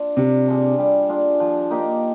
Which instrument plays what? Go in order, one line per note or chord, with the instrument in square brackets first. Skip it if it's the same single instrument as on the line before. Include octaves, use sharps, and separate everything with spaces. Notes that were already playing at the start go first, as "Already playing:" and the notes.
Already playing: [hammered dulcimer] D4 F4
[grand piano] C3 [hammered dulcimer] G3
[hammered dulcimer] D4 F4 G#4
G3
D4 F4 G#4
F3
A#3 D#4 G4